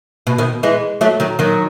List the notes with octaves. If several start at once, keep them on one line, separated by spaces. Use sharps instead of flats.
B2
B2 D#3
E3 G#3
F#3 A3
D#3 F#3
D#3 F#3